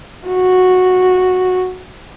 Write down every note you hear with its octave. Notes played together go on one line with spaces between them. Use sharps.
F#4